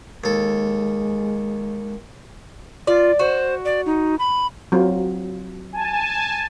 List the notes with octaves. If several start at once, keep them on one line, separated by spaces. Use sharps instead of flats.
D#2 G#3 A4
F4 D5
F#4 C5
D5
D#4
B5
F#3 C4 F4
G#5 A5